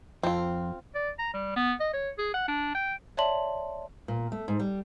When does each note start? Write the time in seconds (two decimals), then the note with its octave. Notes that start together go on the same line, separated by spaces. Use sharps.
0.23 F2 C4 F4
0.95 D5
1.19 A#5
1.34 G3
1.56 B3
1.80 D#5
1.94 C#5
2.19 G#4
2.34 F#5
2.48 D4
2.75 G5
3.17 C#5 D5 E5 A5 C6 F#7
4.08 A#2
4.32 A3
4.48 G#2
4.59 G3